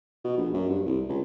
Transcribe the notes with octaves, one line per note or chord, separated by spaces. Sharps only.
B2
A#1
F#2
G2
C2
C#2